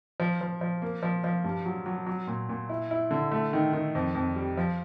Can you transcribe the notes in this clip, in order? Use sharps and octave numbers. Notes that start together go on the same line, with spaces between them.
F3
F3
F3
A#3
F3
F3
G2
F#3
F#3
F#3
A#2
A#2
E4
E4
D3
A3
D#3
D#3
F2
F2
G3
F3